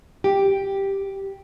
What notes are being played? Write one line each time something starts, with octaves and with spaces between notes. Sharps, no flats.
G4